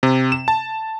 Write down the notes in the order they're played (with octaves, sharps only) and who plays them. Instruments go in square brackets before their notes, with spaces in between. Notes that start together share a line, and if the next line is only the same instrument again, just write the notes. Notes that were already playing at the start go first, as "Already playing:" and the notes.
[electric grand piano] C3
E7
A5